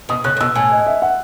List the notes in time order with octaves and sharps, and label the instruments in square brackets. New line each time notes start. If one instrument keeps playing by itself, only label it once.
[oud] B2 [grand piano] D#6
[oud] C#3 [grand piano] F#6
[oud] A2
[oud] B2 [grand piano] E6
[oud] A2 [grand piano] G#5
[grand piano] D#5
E5
F#5